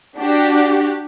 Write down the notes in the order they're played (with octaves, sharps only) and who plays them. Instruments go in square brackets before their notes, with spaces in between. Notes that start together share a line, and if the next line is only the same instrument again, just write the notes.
[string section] D4 F#4 G4